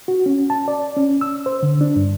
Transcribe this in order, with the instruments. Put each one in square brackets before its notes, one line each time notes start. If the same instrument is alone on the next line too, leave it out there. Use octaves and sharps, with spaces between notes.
[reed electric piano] F#4
C#4
A5
D5
C#4
E6
C5
D3
D4
G2